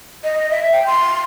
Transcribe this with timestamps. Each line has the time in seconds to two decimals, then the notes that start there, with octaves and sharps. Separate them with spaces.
0.24 D#5
0.51 E5
0.72 G5
0.87 C6